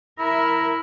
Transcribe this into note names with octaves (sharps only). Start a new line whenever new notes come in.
E4 A#4 E5